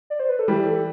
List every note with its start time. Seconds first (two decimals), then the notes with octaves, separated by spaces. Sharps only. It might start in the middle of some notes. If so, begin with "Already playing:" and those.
0.10 D5
0.20 C5
0.29 B4
0.39 A4
0.48 E3 G3 G4
0.66 A4